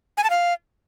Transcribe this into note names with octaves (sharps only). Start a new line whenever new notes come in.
G#5
A5
F5